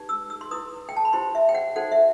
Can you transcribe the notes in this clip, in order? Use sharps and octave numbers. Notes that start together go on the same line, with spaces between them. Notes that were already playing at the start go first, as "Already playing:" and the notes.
Already playing: D#4 G4 B4
E6
E6
C6
E4 B4 D#6
G5
A5
B5
E4 G4 C5 C6
E5
G5
F#5
D#4 F#4 A4 C5 F#5
E5